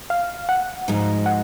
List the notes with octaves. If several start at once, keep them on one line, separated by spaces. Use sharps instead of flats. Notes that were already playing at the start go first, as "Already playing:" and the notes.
F5
F#5
G#2 F3 G#3 D#4 F#4
F#5